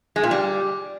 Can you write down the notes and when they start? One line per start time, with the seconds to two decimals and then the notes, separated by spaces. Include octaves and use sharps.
0.16 G#3
0.23 A#2
0.31 G3